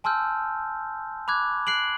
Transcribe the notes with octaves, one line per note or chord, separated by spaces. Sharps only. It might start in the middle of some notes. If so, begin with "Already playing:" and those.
G#5 A5 C6 E6 F6 G6
B5 D6 F#6 G#6
F#6 C7 D7 F#7